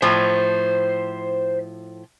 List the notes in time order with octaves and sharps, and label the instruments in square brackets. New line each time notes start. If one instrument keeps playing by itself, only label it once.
[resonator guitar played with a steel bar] A2 F3 [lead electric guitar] C5 B5